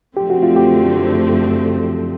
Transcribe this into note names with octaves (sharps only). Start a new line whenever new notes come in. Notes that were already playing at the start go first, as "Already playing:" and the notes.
F#2 D3 F3 A3 C4 G4
F#4
F4
G4